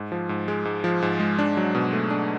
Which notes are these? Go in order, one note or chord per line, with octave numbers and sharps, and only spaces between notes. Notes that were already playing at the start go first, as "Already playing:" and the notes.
Already playing: G#2
F3
G#2
G#3
G#2
F3
G#2
G#3
D4
F#3
B2
A3
D4